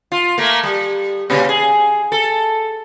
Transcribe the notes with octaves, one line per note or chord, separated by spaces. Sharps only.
F4
A3 A#3
G3
A#2 C#3 G3
G#4
A4